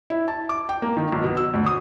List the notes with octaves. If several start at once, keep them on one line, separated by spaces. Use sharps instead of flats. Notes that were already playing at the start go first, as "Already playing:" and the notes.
E4
A5
D6
G5
A#3
D#3
B1
B2
E6
D2
D#6